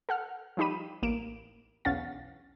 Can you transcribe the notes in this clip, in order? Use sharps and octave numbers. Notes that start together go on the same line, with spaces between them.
A4 F#5 F6
F3 G3 D#4 G4 B5 D#7
A1 A#3 D7 E7
B1 E2 C#4 F5 F#5 A6